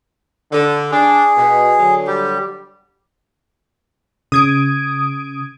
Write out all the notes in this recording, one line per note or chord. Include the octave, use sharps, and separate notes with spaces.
D3
D4 G#4
B2
D3 F#3
G3 G4
C#3 D#6 G#6 D7